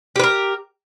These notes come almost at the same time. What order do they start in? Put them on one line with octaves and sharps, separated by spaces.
G4 B4 A#4